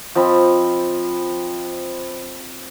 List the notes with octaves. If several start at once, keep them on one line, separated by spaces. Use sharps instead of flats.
F3 C4 D#5 B5